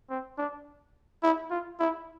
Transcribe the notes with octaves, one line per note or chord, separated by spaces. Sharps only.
C4
D4
E4
F4
E4